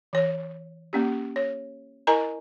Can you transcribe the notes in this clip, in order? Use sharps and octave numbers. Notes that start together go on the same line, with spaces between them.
E3 C#5
A#3 C#4 G4
C#5
E4 A#4 D#5 G#5 A#5